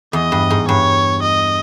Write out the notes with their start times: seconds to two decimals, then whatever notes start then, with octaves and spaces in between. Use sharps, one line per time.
0.13 E2 D#5
0.32 G2
0.50 G#2
0.68 G2 C#5
1.22 D#5